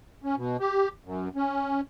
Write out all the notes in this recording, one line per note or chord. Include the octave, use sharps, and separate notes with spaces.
C#4
B2
G4
F#2
C#4